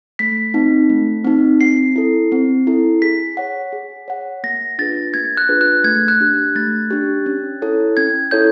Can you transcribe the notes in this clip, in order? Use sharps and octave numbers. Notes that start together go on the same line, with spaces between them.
A3 B6
C4 D#4
A3
C4 D#4
C4 C7
E4 A4
C4
E4 A4
G#4 B6
C#5 F#5
G#4
C#5 F#5
A#3 A#6
D4 F4 G#4 B4 A6
A#3 G#6
F#6
D4 F4 G#4 B4
F#6
A3 G#6
F#6
D4 G4
A3 A6
D4 G4
C#4
E4 A4 C#5
C#4 G#6
E4 A4 C#5 G6